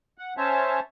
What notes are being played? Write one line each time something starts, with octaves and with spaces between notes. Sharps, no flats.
F#5
C#4 C5 C#5 E5 A5